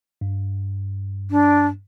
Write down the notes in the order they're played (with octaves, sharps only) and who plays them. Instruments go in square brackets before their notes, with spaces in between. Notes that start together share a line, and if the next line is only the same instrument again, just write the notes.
[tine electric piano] G2
[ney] D4